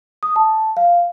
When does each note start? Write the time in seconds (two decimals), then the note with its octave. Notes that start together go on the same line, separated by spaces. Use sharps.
0.23 D#6
0.36 A5
0.77 F5